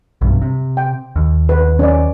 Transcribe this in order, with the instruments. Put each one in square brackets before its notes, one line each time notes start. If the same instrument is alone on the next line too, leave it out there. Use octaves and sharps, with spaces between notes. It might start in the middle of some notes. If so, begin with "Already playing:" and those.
[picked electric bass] B1 G2 C3
C3
[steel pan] G5
[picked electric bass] D#2
[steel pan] B4
C#4 D5